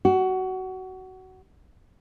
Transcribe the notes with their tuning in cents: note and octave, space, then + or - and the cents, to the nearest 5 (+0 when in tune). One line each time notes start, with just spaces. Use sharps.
F#4 +20